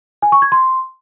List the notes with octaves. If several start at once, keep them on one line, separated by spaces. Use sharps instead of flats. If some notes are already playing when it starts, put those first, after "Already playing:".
G#5
C#6
G#6
C6